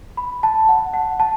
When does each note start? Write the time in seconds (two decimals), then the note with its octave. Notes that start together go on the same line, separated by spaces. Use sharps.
0.17 B5
0.43 A5
0.69 F#5
0.94 F#5
1.20 A5